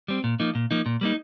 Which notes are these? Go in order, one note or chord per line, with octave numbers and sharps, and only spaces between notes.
G3 C4
A#2
F3 A#3 D#4
A#2
F3 A#3 D#4
A#2
G3 A#3 D#4